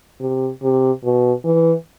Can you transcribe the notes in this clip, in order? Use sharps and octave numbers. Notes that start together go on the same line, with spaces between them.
C3
C3
B2
E3